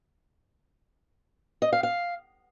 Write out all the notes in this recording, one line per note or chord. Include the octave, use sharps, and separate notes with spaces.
D#5
F5
F5